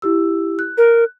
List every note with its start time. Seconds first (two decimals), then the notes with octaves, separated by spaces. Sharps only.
0.02 E4 G4 E6
0.59 F#6
0.78 A#4